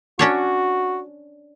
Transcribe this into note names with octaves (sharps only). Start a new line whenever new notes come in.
C#4 D4 F#4 C#5